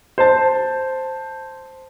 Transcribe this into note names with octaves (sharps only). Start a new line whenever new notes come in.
C5 A5